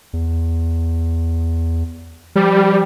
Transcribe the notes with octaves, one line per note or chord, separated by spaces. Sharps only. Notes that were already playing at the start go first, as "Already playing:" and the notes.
E2
F3 G3